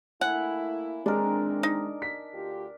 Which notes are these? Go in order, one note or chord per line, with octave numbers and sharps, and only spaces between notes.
A3 A#3 E4 F#5 G#5
D#3 E3 G#3 C4 D4 A#4
D#4
B6
D2 F4 G4